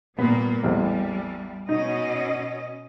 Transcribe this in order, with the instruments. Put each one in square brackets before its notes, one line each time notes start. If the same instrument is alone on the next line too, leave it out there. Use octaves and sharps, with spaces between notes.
[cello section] A#2 G3 A#3 [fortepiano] B3
[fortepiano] A1 E2 C4 [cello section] G3
[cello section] B2 C#4 D#5 [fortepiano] D#4